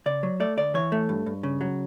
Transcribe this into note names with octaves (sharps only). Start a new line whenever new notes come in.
C#3 D5
F#3
A3 D5
D2 D5
E3 C#5
A3
G2
G2
C#3
F#3